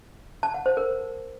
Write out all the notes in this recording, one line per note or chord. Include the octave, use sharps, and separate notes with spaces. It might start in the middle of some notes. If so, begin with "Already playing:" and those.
A5
F#5
C5
A#4